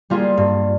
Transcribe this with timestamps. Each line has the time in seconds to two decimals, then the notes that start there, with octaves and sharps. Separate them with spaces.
0.10 G3 A#3 F4 G#4
0.37 G2